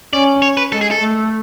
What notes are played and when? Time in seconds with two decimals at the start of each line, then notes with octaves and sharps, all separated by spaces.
0.13 C#4 D5
0.42 C#5
0.57 B4
0.72 G#3 A4
0.81 G#4
0.91 A4
1.01 A3